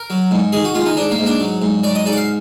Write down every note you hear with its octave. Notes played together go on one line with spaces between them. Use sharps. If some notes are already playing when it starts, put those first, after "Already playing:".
Already playing: A#4
F#3
G#2
D#3 G#4
F#4
G#3 F4
D#4
G#2 D4
A#3
G#2
D4
F#3
G#2
F#3 D5
D#5
G#2 D5
F#5
F5